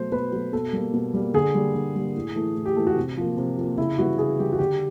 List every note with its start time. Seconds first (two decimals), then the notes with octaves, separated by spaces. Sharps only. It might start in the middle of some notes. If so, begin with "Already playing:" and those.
Already playing: B2 F#3 A3 C5
0.12 B2 B4
0.32 F#3 A3
0.53 B2 A4
0.73 G3 A#3
0.93 B2
1.14 G3 A#3
1.34 D3 G#4
1.55 G3 A#3
1.75 D3
1.96 G3 A#3
2.15 A2
2.36 E3 A3
2.56 A2
2.66 G4
2.76 E3 A3
2.87 F#4
2.96 C3
3.17 F3 A#3
3.37 C3
3.58 F3 A#3
3.78 C#3 E4
3.98 E3 G3 B3 F#4
4.18 C#3 G#4
4.39 E3 G3 B3 G4
4.52 F#4
4.59 D3 G4